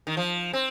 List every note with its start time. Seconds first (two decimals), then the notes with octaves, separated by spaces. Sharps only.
0.07 D#3
0.17 F3
0.53 C4